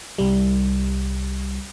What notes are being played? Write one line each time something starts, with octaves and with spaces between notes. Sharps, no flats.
C2 G3